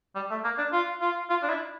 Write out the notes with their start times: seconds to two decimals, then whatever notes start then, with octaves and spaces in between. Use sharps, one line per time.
0.16 G3
0.31 A3
0.44 A#3
0.58 D4
0.73 F4
1.01 F4
1.30 F4
1.43 D4
1.49 E4